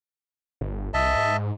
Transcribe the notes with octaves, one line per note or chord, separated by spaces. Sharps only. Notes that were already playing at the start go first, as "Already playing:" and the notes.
G1
C2 D#5 E5 A5
G#2